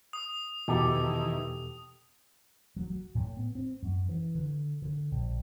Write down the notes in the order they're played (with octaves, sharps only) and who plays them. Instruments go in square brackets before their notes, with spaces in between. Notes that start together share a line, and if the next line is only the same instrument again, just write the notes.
[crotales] D#6
[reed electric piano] E2 B2 [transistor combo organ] D#3 E3 [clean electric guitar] G4 A4
[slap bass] F#3
F#3
A2
B3
C4
F#2
E3
D3
D3
A#1